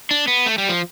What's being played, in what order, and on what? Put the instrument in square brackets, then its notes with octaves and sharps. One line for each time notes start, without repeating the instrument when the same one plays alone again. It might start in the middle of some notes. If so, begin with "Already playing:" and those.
[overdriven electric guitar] D4
B3
A3
G3
F3